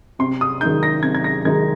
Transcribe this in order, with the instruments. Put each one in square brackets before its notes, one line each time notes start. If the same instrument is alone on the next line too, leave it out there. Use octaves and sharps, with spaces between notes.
[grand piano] C3 C6
D#6
D#3 G#3 D#4 G6
A#6
C3 G#6
G#6
A#6
D#3 G#3 D#4 G#6